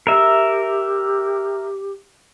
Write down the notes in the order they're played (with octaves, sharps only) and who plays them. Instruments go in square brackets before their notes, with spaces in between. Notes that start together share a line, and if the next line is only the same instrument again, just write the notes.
[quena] G4 [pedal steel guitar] A#4 E5